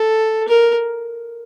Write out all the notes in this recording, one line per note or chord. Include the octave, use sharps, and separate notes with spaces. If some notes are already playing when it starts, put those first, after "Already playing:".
Already playing: A4
A#4